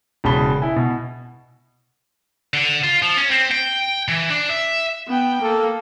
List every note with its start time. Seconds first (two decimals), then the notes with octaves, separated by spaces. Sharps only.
0.24 E1 C#3 G#4 A5 B5 G7
0.62 E4 G#5
0.76 B2
2.54 D3
2.84 F4
3.02 F3
3.17 C#4
3.31 C4
3.51 G5
4.08 E3
4.30 D4
4.50 E5
5.08 B3 G5
5.42 A#3 A4